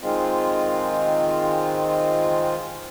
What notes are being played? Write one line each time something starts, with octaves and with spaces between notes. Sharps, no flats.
D#3 G#3 C4 F4